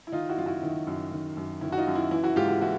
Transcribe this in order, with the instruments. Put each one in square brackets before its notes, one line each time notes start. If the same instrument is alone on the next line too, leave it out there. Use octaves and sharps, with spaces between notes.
[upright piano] E4
D#3 D#4 F4
E4 F#4
F#2 F4
E4 F#4
D#3 E4
F#2
D#3
F#2
D#3 E4
F#4
D#4 F4
F#2
E4
E3 E4
E4 F#4
G#2 F4 G4
E4 F#4
E3 E4 F#4